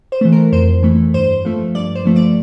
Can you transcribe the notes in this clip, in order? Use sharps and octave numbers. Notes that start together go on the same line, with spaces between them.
C5
E3 A3
A#4
F2 C5
E3 A3
G2 C5
F3 A3
G2 D5
C5
F3 A3
D5